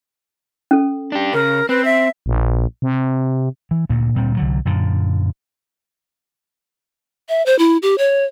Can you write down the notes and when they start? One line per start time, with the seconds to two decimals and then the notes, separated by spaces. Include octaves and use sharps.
0.71 C#4 A4
1.12 D4 G4
1.33 C#3 A#4
1.69 C4 B4
1.85 E5
2.26 A#1
2.82 C3
3.71 E3
3.89 D2 A#2
4.15 D2 A#2 G3 C4
4.37 C2 D3 F#3
4.65 F#2 A#2 D3
7.29 E5
7.46 C5
7.59 E4
7.82 G4
7.98 C#5